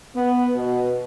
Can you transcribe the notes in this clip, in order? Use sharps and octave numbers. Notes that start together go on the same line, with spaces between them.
B3
B2